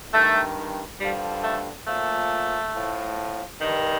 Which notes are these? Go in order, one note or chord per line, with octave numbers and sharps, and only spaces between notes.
G2 D#3 A3
G2 D3 F3 G3
A3
A#2 F3 A3
A2 F3
G2 D#3